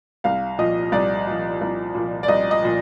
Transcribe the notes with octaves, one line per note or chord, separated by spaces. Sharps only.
C2 F5
A#2 F3 D#5
C2 D5
A#2 F3
C2
A#2 F3
D5
C2 D#5
D#5
A#2 F3